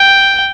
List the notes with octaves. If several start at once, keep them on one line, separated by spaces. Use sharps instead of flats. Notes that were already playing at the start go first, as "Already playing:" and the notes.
Already playing: G5